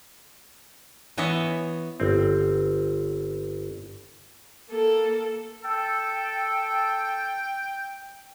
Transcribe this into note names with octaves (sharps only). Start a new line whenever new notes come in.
E3 B3 C#5 D#5 E5
G1 C4
A#3 A4
A4 G5